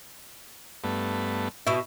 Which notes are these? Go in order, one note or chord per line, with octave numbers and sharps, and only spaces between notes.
G2 A3 B3
B2 E4